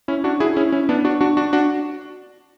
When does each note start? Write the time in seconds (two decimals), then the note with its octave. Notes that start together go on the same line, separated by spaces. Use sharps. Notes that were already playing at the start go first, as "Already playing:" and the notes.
0.08 C#4 E4
0.24 D4 F#4
0.40 E4 G#4
0.56 C#4 E4
0.72 C#4 E4
0.89 B3 D4
1.05 D4 F#4
1.21 D4 F#4
1.37 D4 F#4
1.53 D4 F#4